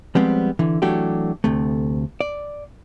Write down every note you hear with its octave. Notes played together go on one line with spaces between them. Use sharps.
F3 G3 G#3 B3 C4
D3 E3
E3 F#3 A3 D4 F#4 G4
D2 C3 A3
D5